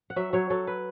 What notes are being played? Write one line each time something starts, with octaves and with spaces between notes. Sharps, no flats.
F#5
F#3 E5
F#3 C#5
F#3 A4
B4